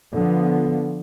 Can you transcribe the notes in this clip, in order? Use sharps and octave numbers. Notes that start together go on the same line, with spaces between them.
D3 F3 B3